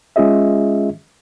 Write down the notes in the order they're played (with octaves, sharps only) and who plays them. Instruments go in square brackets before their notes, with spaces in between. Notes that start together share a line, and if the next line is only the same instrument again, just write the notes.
[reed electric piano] G#3 C#4 F4 G#4 D#5 E5